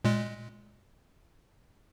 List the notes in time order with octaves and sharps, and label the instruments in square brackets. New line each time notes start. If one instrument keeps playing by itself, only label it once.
[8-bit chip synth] A#2 G#3